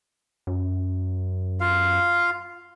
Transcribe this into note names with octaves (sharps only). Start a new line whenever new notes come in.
F#2
F4 F5